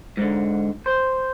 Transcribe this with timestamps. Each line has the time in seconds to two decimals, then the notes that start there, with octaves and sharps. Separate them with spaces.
0.17 G#2 D3
0.86 C5